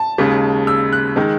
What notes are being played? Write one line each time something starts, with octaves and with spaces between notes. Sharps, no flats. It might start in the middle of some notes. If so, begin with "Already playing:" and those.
Already playing: A5
D#2 C#3 G#3
E6
F#6
D#3 G#3